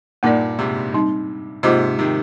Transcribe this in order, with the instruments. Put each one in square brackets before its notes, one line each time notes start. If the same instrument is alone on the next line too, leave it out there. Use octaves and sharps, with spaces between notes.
[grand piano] G2 A#2 [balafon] A#3 D#4 A#4 D5
[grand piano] G#2 C3
[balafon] G3 C4 D#4
[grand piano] G#2 C3 [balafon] A#3 F4 C5 D#5
[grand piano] C3 D#3